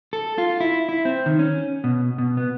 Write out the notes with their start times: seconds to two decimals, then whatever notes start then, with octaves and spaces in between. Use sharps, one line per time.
0.13 A4
0.38 F4
0.60 E4
0.89 E4
1.05 C4
1.26 D#3
1.39 C#4
1.84 B2
2.18 B2
2.37 B3